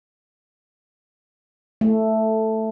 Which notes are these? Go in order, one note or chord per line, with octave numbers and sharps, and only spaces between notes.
A3